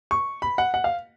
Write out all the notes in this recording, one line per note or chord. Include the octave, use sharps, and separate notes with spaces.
C#6
B5
F#5
F#5
F5